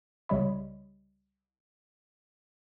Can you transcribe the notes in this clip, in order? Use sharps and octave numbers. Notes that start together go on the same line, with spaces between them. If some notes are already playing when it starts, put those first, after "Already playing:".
C2 C#3 G3 C#5 D#5 B5